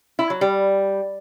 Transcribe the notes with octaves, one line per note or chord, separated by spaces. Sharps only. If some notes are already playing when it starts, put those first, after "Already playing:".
E4
F#3
G3